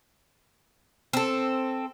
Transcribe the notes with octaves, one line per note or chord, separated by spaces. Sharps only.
C4 A4